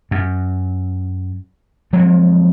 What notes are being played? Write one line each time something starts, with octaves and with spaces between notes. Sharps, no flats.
F#2
F3 F#3 G#3 C4